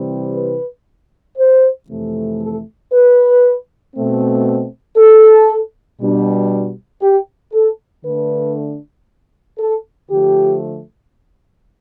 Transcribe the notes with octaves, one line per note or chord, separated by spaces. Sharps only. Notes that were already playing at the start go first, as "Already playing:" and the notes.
Already playing: C3 E3 G3 C4
B4
C5
F2 C3 E3 A3
A4
B4
B2 A3 C4
A4
B2 G3 D4
G4
A4
D3 A3 D4 B4
A4
D3 F3 A3 G4